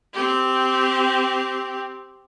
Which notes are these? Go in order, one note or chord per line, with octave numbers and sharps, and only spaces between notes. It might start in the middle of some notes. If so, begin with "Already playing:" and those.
C4 G4